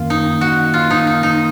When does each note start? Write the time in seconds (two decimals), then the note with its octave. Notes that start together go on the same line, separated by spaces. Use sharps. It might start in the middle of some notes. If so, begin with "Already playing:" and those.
Already playing: F#2 D#3 A#3 F4
0.10 D#4
0.41 F#4
0.74 F4
0.91 D#4
1.07 D#4
1.23 D#4